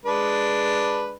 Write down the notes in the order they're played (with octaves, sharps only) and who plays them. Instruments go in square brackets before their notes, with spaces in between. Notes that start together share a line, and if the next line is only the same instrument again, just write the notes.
[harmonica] G#3 D4 B4